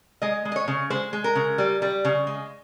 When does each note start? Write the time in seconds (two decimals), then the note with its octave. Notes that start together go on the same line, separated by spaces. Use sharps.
0.22 G#3 D#5
0.45 G#3
0.52 D#5
0.56 C#5
0.68 C#3
0.90 G#3 C5
1.13 G#3
1.24 A#4
1.35 C#3
1.58 G3
1.82 G3
2.05 C#3
2.27 G#3